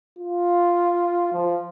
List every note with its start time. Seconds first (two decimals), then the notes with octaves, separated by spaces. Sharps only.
0.18 F4
1.33 F3